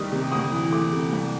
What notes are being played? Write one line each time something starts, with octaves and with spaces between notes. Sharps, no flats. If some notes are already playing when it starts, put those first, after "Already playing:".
Already playing: C2 D#3 G3 D#6
C3
D2 D#6
E3
A3 D6
C3
C2